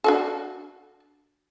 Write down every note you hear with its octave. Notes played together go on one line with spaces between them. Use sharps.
D4 F#4 A4